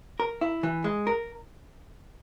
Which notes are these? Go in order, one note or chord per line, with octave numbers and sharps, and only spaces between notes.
A#4
E4
E3
G#3
A#4